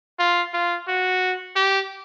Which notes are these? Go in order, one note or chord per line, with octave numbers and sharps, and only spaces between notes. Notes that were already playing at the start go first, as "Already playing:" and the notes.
F4
F4
F#4
G4